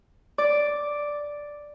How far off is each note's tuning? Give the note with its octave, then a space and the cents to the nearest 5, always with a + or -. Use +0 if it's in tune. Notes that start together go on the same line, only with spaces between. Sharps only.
D5 +0 D6 +0